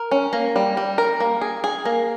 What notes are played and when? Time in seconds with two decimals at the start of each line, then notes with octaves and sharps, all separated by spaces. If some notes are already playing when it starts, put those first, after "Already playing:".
Already playing: A#4
0.11 C#4
0.33 A#3
0.56 G3
0.77 G3
0.98 A#4
1.20 A#3
1.41 G#4
1.64 G#4
1.85 A#3